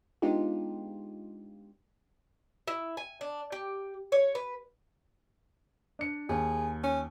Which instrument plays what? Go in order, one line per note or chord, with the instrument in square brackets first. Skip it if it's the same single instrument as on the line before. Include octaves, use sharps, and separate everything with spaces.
[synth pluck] G#3 B3 D4 D#4 F4 G4
[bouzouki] E4
G#5
D4
G4
C#5
B4
[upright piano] D4 C#7
[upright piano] D#2 [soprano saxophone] G#4
[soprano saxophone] C#4